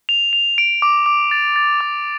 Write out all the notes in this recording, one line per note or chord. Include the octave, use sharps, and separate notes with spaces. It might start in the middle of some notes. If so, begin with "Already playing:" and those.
F7
F7
D7
D6
D6
A6
A6
D6